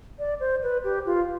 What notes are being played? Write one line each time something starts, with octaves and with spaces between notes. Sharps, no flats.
D5
C5
B4
G4
F4